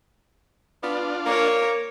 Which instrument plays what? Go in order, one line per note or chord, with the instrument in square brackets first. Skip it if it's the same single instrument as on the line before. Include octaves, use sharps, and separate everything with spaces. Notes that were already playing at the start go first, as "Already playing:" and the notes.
[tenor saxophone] B3 [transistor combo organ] D4 F4
[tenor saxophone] A#3 [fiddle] A#4 C#5